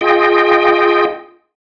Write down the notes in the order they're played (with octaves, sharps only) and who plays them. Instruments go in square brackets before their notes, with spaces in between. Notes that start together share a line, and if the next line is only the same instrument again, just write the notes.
[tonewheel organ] F4 G#4 D#5 G5